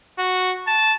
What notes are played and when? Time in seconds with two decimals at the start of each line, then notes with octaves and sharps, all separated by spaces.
0.19 F#4
0.67 A5